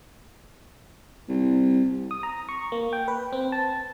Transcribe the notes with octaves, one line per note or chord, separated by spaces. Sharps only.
C2
D#6
A#5
C#6
A#3
G5
B4
C4
A5